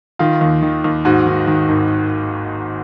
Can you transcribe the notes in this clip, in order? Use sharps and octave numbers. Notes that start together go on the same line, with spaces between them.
D#3 F4
D#2
D#3
D#2
G#2 F#4
D#3
D#3
G#1